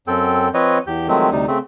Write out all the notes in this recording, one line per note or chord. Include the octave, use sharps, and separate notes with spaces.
F#2 C4 A4 G5
F3 C4 B4 C#5 D#5
E2 G4 G6
D#3 F3 F#3 G#3 A3 C4
D2 C3 G3 D#4
C#3 A3 C4